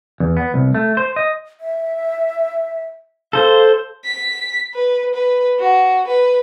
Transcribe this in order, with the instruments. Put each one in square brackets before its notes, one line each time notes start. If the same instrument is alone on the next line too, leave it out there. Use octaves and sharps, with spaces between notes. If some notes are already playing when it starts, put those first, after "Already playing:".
[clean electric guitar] E2
B3
C2
A3
C5
D#5
[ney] E5
[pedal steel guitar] A4 C5 [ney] F5
[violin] B6
B4
B4
F#4
B4